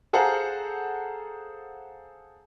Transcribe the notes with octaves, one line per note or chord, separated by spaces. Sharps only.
G#4 A4 C5 F5 F#5 A#5